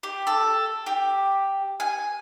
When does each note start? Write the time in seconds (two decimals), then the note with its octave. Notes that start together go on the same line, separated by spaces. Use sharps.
0.03 G4
0.27 A4
0.86 G4
1.80 G#5